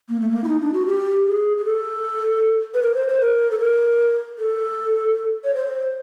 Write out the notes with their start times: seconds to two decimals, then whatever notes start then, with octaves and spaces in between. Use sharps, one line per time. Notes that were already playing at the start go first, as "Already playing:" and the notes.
0.09 A#3
0.20 A3
0.31 A#3
0.44 E4
0.48 D#4
0.62 D4
0.74 F#4
0.87 G4
1.27 G#4
1.57 G#4
1.65 A4
2.74 B4
2.83 A#4
2.95 C5
3.08 C5
3.21 A#4
3.51 A4
3.60 A#4
4.38 A4
5.44 C#5
5.55 C5